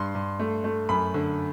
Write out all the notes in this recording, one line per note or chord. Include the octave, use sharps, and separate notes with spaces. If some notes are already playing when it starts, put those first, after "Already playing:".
Already playing: G2 C6
G2
A3
A3
F#2 B5
D3